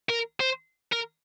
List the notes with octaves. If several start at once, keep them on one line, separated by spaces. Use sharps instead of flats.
A#4
C5
A#4